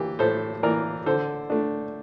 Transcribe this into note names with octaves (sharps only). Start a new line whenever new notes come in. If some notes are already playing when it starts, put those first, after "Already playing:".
Already playing: E3 A#3 G4
A2 A4 C5
E3 A#3 A#4 D5
D3 A4 C5
A3 D4